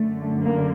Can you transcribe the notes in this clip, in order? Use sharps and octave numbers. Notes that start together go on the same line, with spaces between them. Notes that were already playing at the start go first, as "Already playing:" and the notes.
Already playing: F#2 D3 A3
A#3